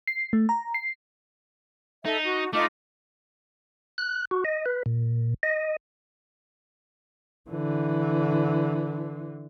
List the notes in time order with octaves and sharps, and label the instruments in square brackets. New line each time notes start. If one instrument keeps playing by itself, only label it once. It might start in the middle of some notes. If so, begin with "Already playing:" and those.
[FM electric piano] C7
A3
A#5
C7
[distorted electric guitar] D#4 [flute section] A4 E5
[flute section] F#4
[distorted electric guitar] A3 [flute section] D#4 F4 D6
[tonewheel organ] F#6
F#4
D#5
B4
A#2
D#5
[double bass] D3 E3